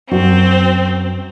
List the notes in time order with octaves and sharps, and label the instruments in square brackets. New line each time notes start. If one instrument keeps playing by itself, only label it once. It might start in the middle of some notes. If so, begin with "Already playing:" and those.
[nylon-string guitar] F#2 F#4 [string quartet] C4